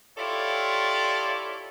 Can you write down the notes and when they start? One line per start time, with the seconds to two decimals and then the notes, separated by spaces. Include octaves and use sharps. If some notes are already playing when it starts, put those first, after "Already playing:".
0.18 E4 F4 G4 A4 C#5 D5